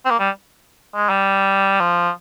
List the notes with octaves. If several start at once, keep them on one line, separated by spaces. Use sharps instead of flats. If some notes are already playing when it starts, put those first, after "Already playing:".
C4
A#3
G3
G#3
G3
F3